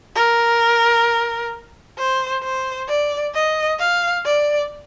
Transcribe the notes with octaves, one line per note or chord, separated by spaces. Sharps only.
A#4
C5
C5
D5
D#5
F5
D5